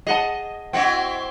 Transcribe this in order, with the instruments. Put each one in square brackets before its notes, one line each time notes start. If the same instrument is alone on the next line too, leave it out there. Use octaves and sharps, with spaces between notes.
[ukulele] G#4 F#5 A5 [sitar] D#5
[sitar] C4 E4 F#4 [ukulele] D#5 F#5 G5